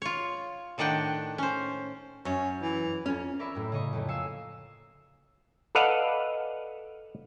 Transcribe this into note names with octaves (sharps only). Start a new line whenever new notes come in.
F4 C#5
A2 D#3 D4 F#5 G5
C#4 C5
F#2 C#4
E3
F2 C#4
A#4 D5 E5 B5 C#6
F#2 A2
C#3 D#5 C#6
F2 C#3 A3 A#3
F5 G#5 E6 C7 C#7 E7
A4 B4 D5 D#5 F5 F#5